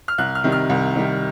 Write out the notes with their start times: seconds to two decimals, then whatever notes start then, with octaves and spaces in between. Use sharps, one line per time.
0.08 F6
0.18 C2 F#6
0.35 F6
0.44 C3 D#3 G3
0.52 F6
0.69 C2
0.95 C3 D#3 G3